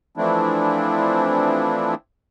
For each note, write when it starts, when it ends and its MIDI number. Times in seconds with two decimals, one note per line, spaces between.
0.17 1.95 52
0.17 1.95 53
0.17 1.95 57
0.17 1.95 60
0.17 1.95 62
0.17 1.95 64